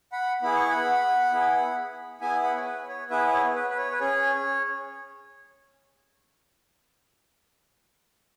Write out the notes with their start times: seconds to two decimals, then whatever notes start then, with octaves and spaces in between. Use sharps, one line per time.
0.12 F#5 B5
0.42 B3 E4 G#4 B5
0.56 C#6
0.70 F#5 B5
1.32 B3 E4 G#4
2.21 B3 E4 G#4 E5 G#5
2.43 F#5 B5
2.56 C#5
2.65 B4
2.88 C#5
3.10 B3 E4 G#4 B4 E5
3.28 E5
3.33 C#5
3.55 B4
3.70 B4
3.77 C#5
3.92 B4
4.00 C#4 G#4 C#5